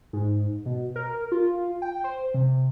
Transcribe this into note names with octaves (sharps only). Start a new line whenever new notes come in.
G#2
B2
A#4
F4
G5
C5
C3